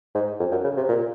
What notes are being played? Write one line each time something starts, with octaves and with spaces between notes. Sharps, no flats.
G#2
F2
F#2
C#3
C3
A#2